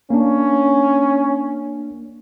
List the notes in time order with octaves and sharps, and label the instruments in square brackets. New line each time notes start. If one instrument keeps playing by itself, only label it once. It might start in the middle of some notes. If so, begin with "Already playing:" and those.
[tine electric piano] A#3 D4 [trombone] C#4